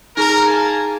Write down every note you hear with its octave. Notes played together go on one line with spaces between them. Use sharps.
D#4 G#4 A#4 A#5
A#3 G#5 A5